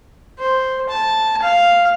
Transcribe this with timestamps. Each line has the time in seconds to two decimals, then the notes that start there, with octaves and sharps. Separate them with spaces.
0.39 C5
0.89 A5
1.42 F5